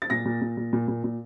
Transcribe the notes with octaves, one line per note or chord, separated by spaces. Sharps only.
A6
A#2 A#6
A#2
A#2
A#2
A#2
A#2
A#2